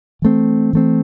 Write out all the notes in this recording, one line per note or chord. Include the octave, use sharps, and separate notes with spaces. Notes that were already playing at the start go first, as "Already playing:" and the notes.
E3 A3 C4
E3 A3 C4